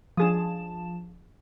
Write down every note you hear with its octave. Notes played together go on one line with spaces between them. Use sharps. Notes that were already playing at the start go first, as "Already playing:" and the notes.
F3 D4 G#4 A5 D#6 E7